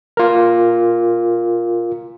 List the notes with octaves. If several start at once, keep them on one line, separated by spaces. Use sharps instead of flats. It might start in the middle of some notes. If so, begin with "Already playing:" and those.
F4 A#4